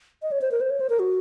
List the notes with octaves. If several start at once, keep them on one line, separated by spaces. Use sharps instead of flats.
D#5
C#5
C5
A#4
C5
C#5
C5
A#4
F#4